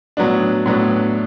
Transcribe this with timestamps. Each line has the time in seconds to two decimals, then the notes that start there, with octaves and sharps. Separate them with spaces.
0.17 A2 F#3 B3 D4
0.66 A2 F#3 B3 D4